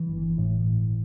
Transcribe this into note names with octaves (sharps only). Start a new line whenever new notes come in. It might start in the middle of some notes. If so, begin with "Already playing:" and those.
Already playing: E3
G1
G1
A2